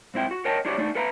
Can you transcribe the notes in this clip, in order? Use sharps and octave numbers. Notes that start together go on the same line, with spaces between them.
G#2 C4 E4 G5
F#4
A#4 C#5 D#5 F#5 G5 A5
D4 E4 F#4 G4 C#5 D5
A3 D4 D#4
A4 B4 E5 F5 A#5